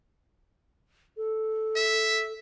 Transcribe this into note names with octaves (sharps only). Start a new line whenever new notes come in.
A4
E5